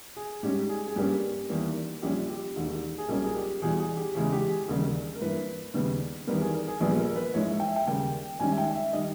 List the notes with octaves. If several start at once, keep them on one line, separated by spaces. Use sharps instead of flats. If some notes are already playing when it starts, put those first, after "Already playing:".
G#4
G#2 G3 C#4 G4
G#4
G#4
G2 G3 A#3 C#4 G4
E2 D#3 G3 A#3
A#1 A#2 G3 C#4 G4
G4
E1 D#2 D#3
G#4
B1 A#2 G3 A#3 C#4 A#4
G#4
G4
E2 B2 G3 G#4
G#4
G4
E2 C#3 G#3 G#4
G4
G#4
E1 D#2 C#3 G3 A#4
A#4
G2 E3 A#3 B4
D#2 C#3 G3 B3
E2 D#3 G3 B3 A#4
G#4
A#4
G#4
A#1 A#2 G3 B3 G#4
A#4
A#4
B4
A#1 G#2 E3 G#3 C#5
G5
E5
G5
D#2 C#3 G3 A#3 G5
G#1 G#2 D#3 G3 C#4 G#5
E5
G5
E5
D#3 G3 D#5